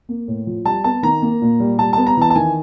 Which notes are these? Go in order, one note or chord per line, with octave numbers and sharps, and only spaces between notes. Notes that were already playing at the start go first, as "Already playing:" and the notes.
A#3
A2
F3
G3 A5
B3 A5
D#3 A#5
A#3
A#2
G3
G3 A5
B3 A5
A#5
E3 A5
A5
D#3 G#5